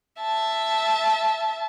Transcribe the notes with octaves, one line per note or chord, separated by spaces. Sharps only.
E5 A5